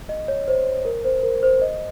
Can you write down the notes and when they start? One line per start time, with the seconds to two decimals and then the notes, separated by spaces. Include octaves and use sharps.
0.09 D#5
0.28 C#5
0.48 C5
0.85 A#4
1.05 C5
1.23 A#4
1.43 C5
1.62 D#5